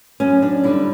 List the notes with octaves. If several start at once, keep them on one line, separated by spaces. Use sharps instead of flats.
F#2 C#4
D4
D3 G3 E4